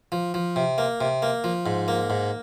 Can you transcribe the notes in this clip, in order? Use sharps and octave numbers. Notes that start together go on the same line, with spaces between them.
F3
F3
C3
A#3
C3
A#3
F3
G#2
A#3
G#2